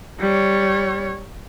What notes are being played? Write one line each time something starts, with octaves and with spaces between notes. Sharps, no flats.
G3 C#5